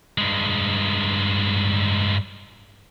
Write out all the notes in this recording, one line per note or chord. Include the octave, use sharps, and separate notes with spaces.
G2 G#3